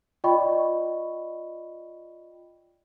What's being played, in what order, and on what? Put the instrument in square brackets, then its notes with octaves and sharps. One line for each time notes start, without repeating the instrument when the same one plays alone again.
[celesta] F4 D5 D#5 G5 B5 C#6